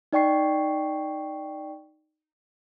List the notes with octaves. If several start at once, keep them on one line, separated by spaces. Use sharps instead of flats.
D#4 D5 G5 C#6 C7